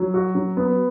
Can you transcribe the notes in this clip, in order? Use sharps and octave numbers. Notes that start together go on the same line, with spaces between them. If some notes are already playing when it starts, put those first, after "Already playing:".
Already playing: F#3
F#4
F#3
B3